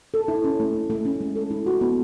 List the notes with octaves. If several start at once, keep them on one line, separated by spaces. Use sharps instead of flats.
A4
E4
C#4
A3
C#4
A3
C#4
G#3
A4
E4
F#4
B3